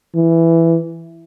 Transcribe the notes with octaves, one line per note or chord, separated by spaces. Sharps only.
E3